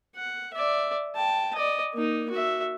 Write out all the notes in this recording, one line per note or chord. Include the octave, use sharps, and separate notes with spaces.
F#5
D5 E5
G5 A5
D5 D#5
A#3 D#4
F#4 E5